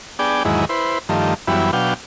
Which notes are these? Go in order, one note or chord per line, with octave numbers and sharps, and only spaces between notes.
B3 D4 G#4 D5 G5
E2 G#2 D#3 F#3 G#3 E4
E4 B4 C5
G2 D#3 F3 A3
F#2 E3 G3 B3 E4
B2 F#3 D4 F5 G5